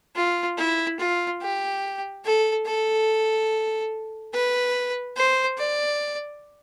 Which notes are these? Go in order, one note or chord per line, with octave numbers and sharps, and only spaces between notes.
F4
E4
F4
G4
A4
A4
B4
C5
D5